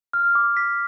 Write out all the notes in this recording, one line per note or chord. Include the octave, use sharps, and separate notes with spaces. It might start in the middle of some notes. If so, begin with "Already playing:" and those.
F6
D6
B6